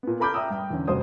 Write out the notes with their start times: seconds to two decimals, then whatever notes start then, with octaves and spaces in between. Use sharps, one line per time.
0.03 A#2 B3
0.20 A4 A#5 B5 D6 F6 G6
0.34 E5 G5 A#5 D#6 E6
0.50 G2 G5
0.70 E2 D3 C#4
0.88 F1 G2 F#4 C5 D#6